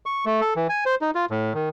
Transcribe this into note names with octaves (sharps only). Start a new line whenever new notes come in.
C#6
A3
A4
E3
G#5
C5
D#4
F4
A2
D#3